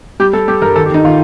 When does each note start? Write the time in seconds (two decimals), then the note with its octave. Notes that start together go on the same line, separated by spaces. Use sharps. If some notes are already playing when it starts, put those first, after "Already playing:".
0.20 G3 G4
0.33 G3 A4
0.48 G3 G4
0.62 G2 A#4
0.75 D#3 A4
0.85 G4
0.90 D#3 D#4
1.04 D#3 F4